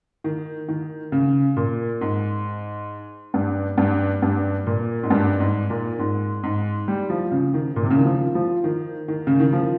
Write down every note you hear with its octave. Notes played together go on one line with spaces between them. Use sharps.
D#3
D#3
C#3
A#2
G#2
G2
G2
G2
A#2
G#2
G2
G#2
A#2
G#2
G#2
G3
F3
C#3
D#3
A#2
C3
C#3
D#3
F3
F3
D#3
D#3
C#3
D#3
F3